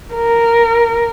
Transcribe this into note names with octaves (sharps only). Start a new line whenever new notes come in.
A#4